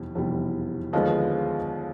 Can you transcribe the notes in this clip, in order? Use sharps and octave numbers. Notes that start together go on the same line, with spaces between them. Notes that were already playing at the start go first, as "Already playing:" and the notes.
Already playing: F1 E2 B2 G3
F1 E2 B2 G3
D#2 D3 F3 G#3 B3 D#5 F5